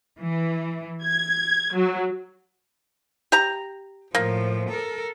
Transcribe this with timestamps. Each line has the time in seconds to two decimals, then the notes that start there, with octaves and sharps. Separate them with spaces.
0.20 E3
1.03 G#6
1.74 F#3
3.32 G4 A#5
4.15 A2 F3 A#3
4.70 A4 A#4